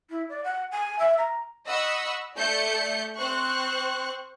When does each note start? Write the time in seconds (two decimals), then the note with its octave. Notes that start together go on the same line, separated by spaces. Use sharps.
0.10 E4
0.29 D5
0.44 F#5
0.71 G#5
0.99 E5
1.18 A#5
1.68 D#5 F#5 B5 C#6 E6
2.37 A3 D5 G6 C#7
3.18 C4 C5 C#6 F#6